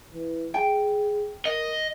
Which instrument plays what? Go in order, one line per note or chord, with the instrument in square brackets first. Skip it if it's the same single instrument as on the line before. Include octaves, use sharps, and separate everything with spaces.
[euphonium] E3
[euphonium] G#4 [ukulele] G5 G#5
[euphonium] A#4 [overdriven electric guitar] D#5